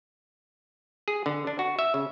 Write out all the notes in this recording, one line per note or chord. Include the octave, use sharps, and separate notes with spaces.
G#4
D3
D4
F#4
E5
C#3